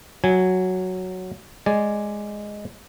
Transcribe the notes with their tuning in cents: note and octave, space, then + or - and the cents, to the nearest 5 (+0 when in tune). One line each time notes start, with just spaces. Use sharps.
F#3 +0 G#5 +0
G#3 +0 D5 +0 G#5 +0